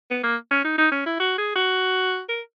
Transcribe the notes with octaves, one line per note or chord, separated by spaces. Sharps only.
B3
A#3
C#4
D#4
D#4
C#4
E4
F#4
G#4
F#4
A#4